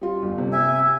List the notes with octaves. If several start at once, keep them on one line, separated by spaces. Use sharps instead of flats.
G3 F4
G1
C3
E5 G#5